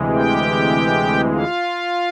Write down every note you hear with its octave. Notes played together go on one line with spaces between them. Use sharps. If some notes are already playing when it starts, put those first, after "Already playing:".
Already playing: D2 C3 E3 G#3
G4 G5
F4 F5